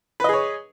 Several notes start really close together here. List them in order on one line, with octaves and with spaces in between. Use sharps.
B4 D#5 G#4 C#5